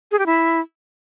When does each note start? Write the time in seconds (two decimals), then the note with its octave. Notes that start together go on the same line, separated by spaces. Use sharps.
0.12 G#4
0.19 G4
0.26 E4